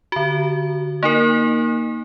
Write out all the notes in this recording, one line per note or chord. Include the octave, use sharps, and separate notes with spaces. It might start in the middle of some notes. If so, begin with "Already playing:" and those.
D3 F#4
A#3 D#4 A#4